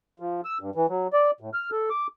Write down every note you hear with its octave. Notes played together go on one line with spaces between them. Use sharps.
F3
E6
G2
E3
F#3
D5
A2
F6
A4
D6